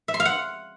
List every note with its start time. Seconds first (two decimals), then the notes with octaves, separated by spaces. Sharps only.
0.08 E5
0.14 C6
0.20 F5
0.25 F#5